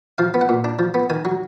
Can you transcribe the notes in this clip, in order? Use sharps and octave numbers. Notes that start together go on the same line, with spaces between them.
F3 F5
B3
F#5
A#2
D4
F3
B3
D#3 G#5
F#3